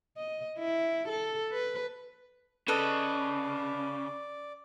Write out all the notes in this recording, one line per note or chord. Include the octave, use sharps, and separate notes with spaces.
D#5
E4
A4
B4
C#3 A4 B4 D5 D#5